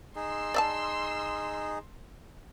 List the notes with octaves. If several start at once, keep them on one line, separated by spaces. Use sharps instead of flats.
D#4 G#4 C6 E6
D5 E5 A5